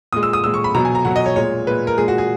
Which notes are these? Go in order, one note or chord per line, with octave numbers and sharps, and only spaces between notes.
A#2 G#3 D#6
E6
D#6
A#2 G#3 E6
C#6
B5
B2 F#3 A#5
G#5
A#5
B2 F#3 F#5
D#5
C#5
A#2 G#3 C#5
A#2 G#3 B4
A#4
A#2 G#3 G#4
F#4
G#4